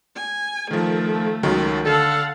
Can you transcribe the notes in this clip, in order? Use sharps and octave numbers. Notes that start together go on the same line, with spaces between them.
G#5
D#3 F3 A3
C#2 D#3 F#3
D3 A4 F5 F#5